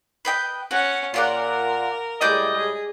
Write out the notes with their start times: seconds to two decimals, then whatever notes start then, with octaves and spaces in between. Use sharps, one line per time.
0.25 B4 D#5 G5
0.71 C#4 F#4 F#5
1.14 A#2 F4 A#4 D5 F#5
2.21 A2 G3 G#3 D5 D#5 D6 G6
2.57 G#4